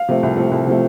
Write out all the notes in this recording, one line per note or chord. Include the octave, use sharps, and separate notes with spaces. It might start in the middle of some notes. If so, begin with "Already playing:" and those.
Already playing: F5
C3 F3 A3
C2
C3 F3 A3
C2
C3 F3 A3